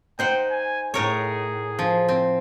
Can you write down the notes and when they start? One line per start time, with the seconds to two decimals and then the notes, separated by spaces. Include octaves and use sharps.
0.19 D#4 C5 F#5 G5
0.50 G#5
0.94 A2 G#4 A#4 C#5
1.79 F3
2.09 C4